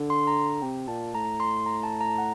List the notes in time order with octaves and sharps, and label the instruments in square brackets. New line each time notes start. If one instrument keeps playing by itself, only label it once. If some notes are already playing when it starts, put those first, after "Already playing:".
Already playing: [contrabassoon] D3
[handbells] C6
A#5
[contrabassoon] C3 [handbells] G5
[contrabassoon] A#2 [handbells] A5
[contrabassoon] A2 [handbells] A#5
[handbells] C6
A#5
A5
A#5
F#5